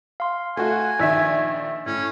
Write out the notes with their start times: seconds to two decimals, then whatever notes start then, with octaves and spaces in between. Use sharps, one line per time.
0.20 F5 C6
0.57 A3 F#4 G#5
1.00 A#1 D#3 D5 E5 E6 B6
1.86 A2 C#4